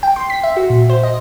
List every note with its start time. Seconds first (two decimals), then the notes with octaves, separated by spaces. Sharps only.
0.03 G5
0.16 C6
0.30 B6
0.44 E5
0.57 F#4
0.70 A#2
0.90 C5
1.03 D#5